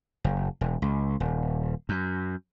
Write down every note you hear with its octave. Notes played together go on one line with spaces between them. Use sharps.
F#1
E1
C#2
D#1
F#2